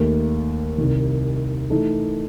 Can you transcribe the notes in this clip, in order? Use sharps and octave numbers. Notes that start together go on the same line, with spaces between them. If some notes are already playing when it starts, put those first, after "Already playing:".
Already playing: D#2 D#3 A3
C2 C3 D#3
E3 A3 D#4 A4